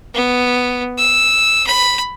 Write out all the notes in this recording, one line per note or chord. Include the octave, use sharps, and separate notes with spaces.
B3
E6
B5